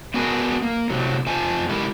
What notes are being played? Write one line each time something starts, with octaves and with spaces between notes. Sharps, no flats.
B3 D4 F#4 G#4 A#4 B4
A#3
A2 C3 F#3
F2 F3 G#5 A5
G#3 A3 C4 E4 G4 A#4